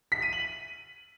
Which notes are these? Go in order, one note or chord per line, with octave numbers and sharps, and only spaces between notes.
B6
D#7
F#7